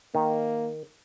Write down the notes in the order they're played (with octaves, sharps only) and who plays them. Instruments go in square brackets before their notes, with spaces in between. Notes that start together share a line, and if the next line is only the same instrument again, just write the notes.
[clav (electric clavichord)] D#3 [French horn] A#3